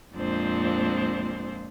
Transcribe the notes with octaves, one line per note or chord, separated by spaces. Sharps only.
F2 A#2 G#3 C4 D4 C5